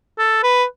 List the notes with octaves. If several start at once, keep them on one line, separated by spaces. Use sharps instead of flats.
A4
B4